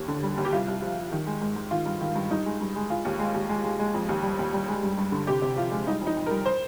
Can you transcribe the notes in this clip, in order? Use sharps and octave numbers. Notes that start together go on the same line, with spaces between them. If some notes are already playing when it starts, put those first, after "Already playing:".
Already playing: D#2
D3
G3
D#2
G4
C2 F4
C2
F3
F3
D#3
G#3
G#2
G#2
D#3 F4
G2
D#3
G2
G2 D#4
G#3
G2
G#3
G#3 F4
D#2
G#3
D#2
G#3
G#3
G#3
F2
D#2
G3
D#2
G3
G#3
G2
G2
D3
C3 G4
C3
F3 F4
G#3
G3 D#4
F2
D#4
F2
A#4
G3
C5